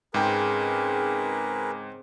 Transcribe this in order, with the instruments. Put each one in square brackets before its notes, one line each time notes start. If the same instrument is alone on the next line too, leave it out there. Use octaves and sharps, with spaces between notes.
[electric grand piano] G#2 G5 [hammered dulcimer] C#3 C4 [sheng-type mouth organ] G#4 A#4 B4